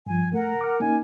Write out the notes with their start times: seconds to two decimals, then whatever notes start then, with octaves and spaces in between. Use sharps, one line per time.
0.06 G2 F3 G#5
0.33 A3 A#4 F#5
0.61 D6 F6
0.80 A#3 C#4 D#4 G#5